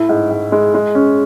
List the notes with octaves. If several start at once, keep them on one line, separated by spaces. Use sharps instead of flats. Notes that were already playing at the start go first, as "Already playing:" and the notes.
Already playing: A2 E4
G#2
G#2
G#3
G#3
C#4